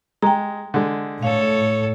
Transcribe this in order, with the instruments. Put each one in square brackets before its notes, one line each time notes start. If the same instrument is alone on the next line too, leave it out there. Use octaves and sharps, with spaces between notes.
[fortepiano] G#3 [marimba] G5 A#5
[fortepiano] D3 G#3
[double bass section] A2 [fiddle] A4 C#5 [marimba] F5